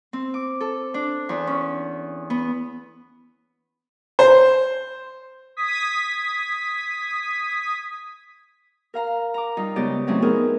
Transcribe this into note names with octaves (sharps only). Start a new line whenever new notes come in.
C4
D6
A4
D4
E2
C#4
B3
C5
D#6 G#6 B6
A#4 F5 A#5
A#5 D6
G3 D#4 F4
C#3 G#3 B3 G4 D5 D#5
F#3 A3 C4 C#4 D#4
B3 C4 D#4 E4 G#4 A#4